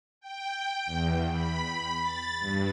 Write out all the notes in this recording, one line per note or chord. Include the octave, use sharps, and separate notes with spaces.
G5
E2
B5
A6
G2